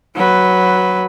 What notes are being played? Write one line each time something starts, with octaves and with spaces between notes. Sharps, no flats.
F#3 B4